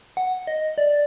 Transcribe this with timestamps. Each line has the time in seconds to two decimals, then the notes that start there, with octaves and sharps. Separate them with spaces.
0.17 F#5
0.47 D#5
0.78 D5